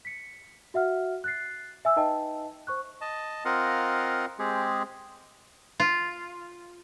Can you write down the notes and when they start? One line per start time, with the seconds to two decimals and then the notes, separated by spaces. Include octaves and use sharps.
0.05 B6 C#7
0.74 F#4 E5 F#5 F6
1.24 F#6 A6 C7
1.85 E5 G#5 E6
1.96 D#4 B4 D#5 G5 A5
2.67 C5 C#6 F#6
3.01 D#5 A5
3.45 C4 F4 A#4 D#5 F5 F#5
4.39 G#3 C4 G4 G#4
5.80 F4